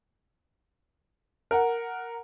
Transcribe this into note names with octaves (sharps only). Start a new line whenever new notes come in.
A#4 F#5